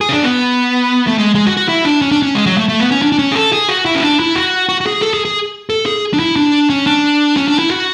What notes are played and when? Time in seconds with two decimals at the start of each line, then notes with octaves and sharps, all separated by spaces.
0.01 G#4
0.09 C#4
0.13 D4
0.23 B3
1.07 A3
1.18 G#3
1.35 G#3
1.46 F#4
1.57 F#4
1.68 E4
1.85 D4
2.02 C#4
2.12 D4
2.22 C#4
2.35 G#3
2.46 F#3
2.58 A3
2.69 A3
2.80 B3
2.91 C#4
3.02 D4
3.12 D4
3.19 C#4
3.32 G#4
3.36 A4
3.52 G#4
3.69 F#4
3.85 E4
3.95 C#4
4.03 D4
4.20 E4
4.36 F#4
4.69 F#4
4.81 F#4
4.86 G#4
5.02 A4
5.14 G#4
5.25 G#4
5.70 A4
5.86 G#4
6.13 D4
6.19 E4
6.36 D4
6.70 C#4
6.87 D4
7.37 C#4
7.48 D4
7.59 E4
7.70 F#4